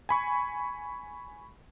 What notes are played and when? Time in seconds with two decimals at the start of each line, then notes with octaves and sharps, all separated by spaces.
0.09 G#5 B5 C#6